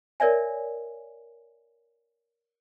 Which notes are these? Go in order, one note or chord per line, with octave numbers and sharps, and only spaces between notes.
A#4 C#5 D5 E5 G#5